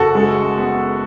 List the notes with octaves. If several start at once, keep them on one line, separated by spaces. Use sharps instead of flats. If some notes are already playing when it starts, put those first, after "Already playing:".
Already playing: F#1 F#4 A4
G#3
B3